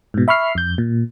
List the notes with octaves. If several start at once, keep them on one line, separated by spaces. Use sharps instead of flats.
G#2 B2
E5 B5 C#6 F6 C7
F2 G6
A#2